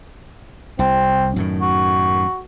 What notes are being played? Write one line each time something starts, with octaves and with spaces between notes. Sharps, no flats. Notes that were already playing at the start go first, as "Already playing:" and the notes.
C2 C4
F#2 A2 D#3
F#4